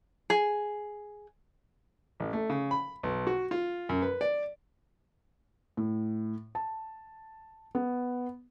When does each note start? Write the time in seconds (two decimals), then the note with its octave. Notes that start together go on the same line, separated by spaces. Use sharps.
0.30 G#4
2.20 A1
2.33 A3
2.50 C#3
2.71 B5
3.03 B1
3.27 F#4
3.51 F4
3.89 F#2
4.02 B4
4.21 D5
5.77 A2
6.55 A5
7.75 B3